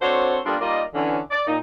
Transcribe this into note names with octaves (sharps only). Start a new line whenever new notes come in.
C4 D4 F#4 A4 C5 C#5
G3 A#3 B3 D4 F4 A4
G3 A#3 D#4 F4 D5 D#5
D3 E3 C#4
D5
A#2 D#4